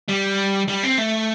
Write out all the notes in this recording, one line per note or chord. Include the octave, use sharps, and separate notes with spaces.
G3
G3
C4
A3